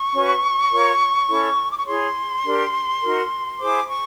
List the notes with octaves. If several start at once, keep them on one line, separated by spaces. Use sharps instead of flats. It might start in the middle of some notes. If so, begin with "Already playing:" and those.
Already playing: C#6
C#4 F#4 B4
F4 A#4 C#5
C#4 E4 A4 C#5
D6
C#6
E4 G#4 C#5 C6
D4 G4 A#4
D#4 F#4 A#4
E4 G#4 C5 D6
C#6